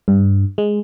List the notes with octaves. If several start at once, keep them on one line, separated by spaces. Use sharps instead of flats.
G2
G#3